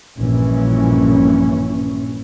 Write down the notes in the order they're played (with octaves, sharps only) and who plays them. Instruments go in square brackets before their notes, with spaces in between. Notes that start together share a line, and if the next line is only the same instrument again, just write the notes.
[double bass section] A#1 G2 A#2 E3 C#4